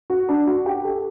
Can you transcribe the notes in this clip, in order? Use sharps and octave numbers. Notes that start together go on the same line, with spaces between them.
F#4
D4
F#4
G4
A4